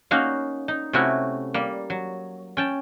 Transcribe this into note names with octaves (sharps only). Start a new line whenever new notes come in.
A#3 C#4 D#4 F#4 F5
D#4
C3 A3 C#4 E4 F#4
G3 A#3
F#3
C#4 G5 A5